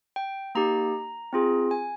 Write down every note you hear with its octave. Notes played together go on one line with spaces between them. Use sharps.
G5
A#3 D#4 G4 A#5
C4 F4 G#4
G#5